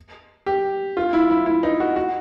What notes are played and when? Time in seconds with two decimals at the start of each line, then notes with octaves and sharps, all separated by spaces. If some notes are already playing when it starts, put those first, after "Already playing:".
0.46 G4
0.97 F4
1.13 E4
1.30 E4
1.46 E4
1.63 D#4
1.80 F#4
1.96 F#4